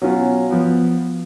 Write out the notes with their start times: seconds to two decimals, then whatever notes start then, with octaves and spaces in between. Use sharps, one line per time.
0.01 B2 F#3 C#4 F4
0.51 F3 B3